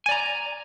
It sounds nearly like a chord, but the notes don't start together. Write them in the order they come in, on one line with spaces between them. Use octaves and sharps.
G#5 D5 A#5